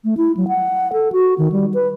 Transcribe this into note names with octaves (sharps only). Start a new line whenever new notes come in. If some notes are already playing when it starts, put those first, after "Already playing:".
A3
E4
F#3
F#5
A4
F#4
D#3
G3
B4